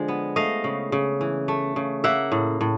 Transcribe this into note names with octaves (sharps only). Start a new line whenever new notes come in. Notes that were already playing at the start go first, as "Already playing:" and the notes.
Already playing: D3 F3 G#3
B3
A3 D#5 F5
C#3
C#3
E3
A3
C#3
A#3 E5 F#5
A2
A2